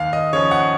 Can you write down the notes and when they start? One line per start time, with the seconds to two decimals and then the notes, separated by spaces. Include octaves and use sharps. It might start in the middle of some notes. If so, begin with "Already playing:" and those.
Already playing: D#2 F5
0.13 D#5
0.33 C#3 F3 C#5
0.51 F#5